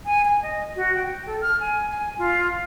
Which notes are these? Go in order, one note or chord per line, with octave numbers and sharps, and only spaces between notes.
G#5
G#5
D#5
F#4
G5
A4
F6
G#5
G#5
F4